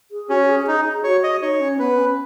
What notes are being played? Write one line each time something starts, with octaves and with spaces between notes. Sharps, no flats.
G#4
C#4 F#4
F#4
G#4
D#4 G#4
F#4 C#5
D#5
D#4 C#5
C#4
B3 B4
C#4